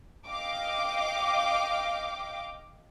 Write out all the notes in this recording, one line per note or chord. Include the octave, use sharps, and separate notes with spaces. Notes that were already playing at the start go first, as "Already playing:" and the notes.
D#5 F5 G5 D6